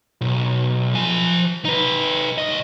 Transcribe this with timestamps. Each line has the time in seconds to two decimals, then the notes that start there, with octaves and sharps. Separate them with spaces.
0.21 B1
0.95 F3 G#5
1.65 D#4 B4
2.38 C2 D#5